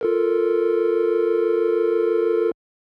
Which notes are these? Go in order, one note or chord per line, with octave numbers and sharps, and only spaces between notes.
F4 A4 A#4